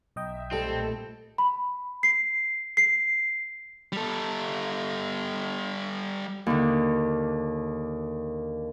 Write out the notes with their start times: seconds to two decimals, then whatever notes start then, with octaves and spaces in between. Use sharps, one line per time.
0.16 B1 D#5 E5 G5
0.51 A#2 G3 A3 C4 A4
1.38 B5
2.03 C7
2.77 C7
3.92 G3 A4
6.47 D#2 D3